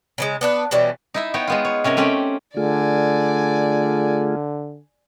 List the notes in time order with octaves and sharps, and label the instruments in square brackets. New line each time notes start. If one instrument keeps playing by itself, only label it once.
[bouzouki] C#3 E3 G#3
B3 D4 B4
B2 E3 G3 C#4
[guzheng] D#4 E4 E5
B3 D#4 C#5 G5
G#3 B3 F4
C#5
C3 C#4 A#4 G#5
A3 C4 C#4 G4 G5
[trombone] D3 [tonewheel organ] A3 F4 G#4 [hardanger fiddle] D5 G#5